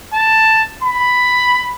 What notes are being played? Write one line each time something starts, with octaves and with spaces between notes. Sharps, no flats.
A5
B5